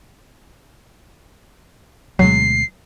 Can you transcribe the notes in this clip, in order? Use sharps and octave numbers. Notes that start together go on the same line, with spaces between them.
D2 B2 F#3 G#3 C7